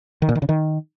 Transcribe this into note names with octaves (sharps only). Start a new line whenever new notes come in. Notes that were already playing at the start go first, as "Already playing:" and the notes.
D#3
A#2
D#3
C#3
D#3